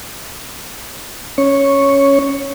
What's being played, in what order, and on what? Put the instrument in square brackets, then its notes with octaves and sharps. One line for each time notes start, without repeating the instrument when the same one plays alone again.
[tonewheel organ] C#4 C#5 C#6